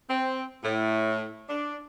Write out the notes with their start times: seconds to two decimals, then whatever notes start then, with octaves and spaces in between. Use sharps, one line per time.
0.10 C4
0.64 A2
1.49 D4